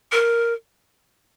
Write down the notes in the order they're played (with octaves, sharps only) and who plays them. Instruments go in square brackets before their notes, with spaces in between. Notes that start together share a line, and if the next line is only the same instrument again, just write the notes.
[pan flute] A#4